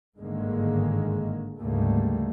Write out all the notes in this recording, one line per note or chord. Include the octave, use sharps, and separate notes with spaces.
G1 G#2 D3 D#3 G#3 A#3
D2 G#2 C#3 G3 A3 A#3